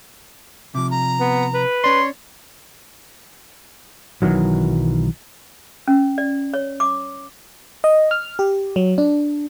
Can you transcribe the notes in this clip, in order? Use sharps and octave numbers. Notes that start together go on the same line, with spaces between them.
C3 F3 D6
A#5
B3
B4
C#4 C#5 D5 C6
B1 D#3 E3 F#3
C#4
D5
C#5
D6
D#5
F6
G4
F#3
D4